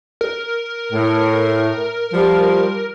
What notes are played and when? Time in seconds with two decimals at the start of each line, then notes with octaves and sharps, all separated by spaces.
0.21 A#4
0.93 A2
2.13 F3 G3